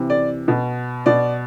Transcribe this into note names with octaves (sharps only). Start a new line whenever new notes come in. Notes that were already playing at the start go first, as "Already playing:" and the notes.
Already playing: C3 E3
D5
B2
B2 D5